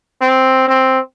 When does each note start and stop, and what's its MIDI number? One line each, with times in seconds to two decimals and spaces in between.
0.21 0.65 60
0.68 0.99 60